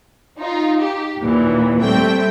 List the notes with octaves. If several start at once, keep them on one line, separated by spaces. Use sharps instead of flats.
D#4 F4
G4
D#2 A#2 E3
G3 A3 C4 E5 G5